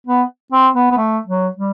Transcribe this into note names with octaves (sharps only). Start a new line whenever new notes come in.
B3
C4
B3
B3
A3
F#3
G3